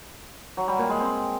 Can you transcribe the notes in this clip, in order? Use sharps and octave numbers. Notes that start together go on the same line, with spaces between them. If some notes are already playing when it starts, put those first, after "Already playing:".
F#3
G3
A#2
G#3
C4